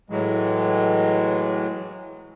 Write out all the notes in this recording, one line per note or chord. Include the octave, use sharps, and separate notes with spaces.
A2 E3 F#3 G#3